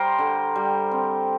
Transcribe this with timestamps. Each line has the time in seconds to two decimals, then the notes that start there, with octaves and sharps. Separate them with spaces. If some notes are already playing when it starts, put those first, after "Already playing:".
Already playing: G3 A#4 C5
0.19 D3
0.56 G3
0.91 C4